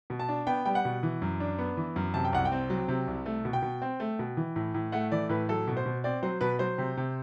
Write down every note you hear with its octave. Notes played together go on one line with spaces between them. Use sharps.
B2
A5
D4
B3 G5
G3 G5
F#5
B2
E3
F#2
D4
B3
E3
F#2
C3 A5
G5
C2 F#5
G5
C4
F#3
C3
C2
A3
B2
G5
B2
C4
A3
B2
E3
A2
A2
A3 F#5
E3 D5
A2 B4
F#3 A4
B2
C5
B2
C4 D5
F#3 C5
B2 B4
F#3 C5
C3
C3